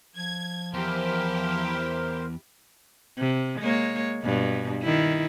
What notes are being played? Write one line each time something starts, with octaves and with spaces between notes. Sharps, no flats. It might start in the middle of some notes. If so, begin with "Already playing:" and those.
F3 G#6
E2 E4 G4 A#4 C5
C3
G#3 A#3 C#5
G2 B2
D#3 E4